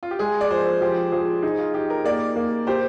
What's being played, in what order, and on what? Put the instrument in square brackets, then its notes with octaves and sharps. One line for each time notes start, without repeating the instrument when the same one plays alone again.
[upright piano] F4
G4
[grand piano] G#3 [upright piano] G#4
[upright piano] D5
[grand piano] F3 [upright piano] C5
[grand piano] F3 [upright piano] G4
[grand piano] F3 [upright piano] G#4
[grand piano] D#4 [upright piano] G#4
[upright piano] F4
[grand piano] D#4 [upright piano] G4
[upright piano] A#4
[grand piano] A#3 [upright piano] D5
[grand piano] A#3
[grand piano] G4 [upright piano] C5